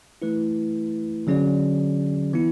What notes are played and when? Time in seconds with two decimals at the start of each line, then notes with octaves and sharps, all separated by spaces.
0.22 E3 A3 E4 B4
1.27 D3 F#3 C#4 G#4 D5
2.33 E3 B3 E4